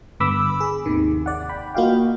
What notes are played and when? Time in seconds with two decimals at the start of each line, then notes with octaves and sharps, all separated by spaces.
0.20 G2 D3 B3 B5 D6 E6
0.60 G#4
0.86 G#1 D#2 C3 D#3
1.26 D5 F#5
1.49 G5 B5
1.74 A#3 F4 F#4 D#5 F5 G5